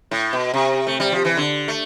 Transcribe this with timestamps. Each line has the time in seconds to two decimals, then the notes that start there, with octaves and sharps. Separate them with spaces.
0.11 A2
0.33 B2
0.54 C3
0.87 A3
1.00 G3
1.12 F3
1.25 E3
1.37 D3
1.68 A3